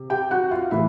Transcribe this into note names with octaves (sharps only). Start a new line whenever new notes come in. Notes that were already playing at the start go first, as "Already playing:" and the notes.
Already playing: C3
G4 G5
F#4 F#5
F4 F5
A2 E3 E4 E5